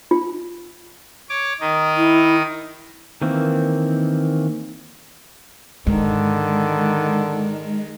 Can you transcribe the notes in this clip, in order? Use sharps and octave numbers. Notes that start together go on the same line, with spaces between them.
F4
C#5 D6
D#3 D#4
E4
D#3 E3 A#3 C4
G#2 D3 D#3 G#3